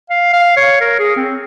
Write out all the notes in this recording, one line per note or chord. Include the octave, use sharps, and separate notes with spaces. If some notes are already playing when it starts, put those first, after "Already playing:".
F5
F5
C#5
A#4
G#4
C4